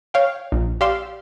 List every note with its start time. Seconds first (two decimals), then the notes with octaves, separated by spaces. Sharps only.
0.14 C#5 F5 G5
0.52 A#1
0.81 G4 D5 F5 C6 E6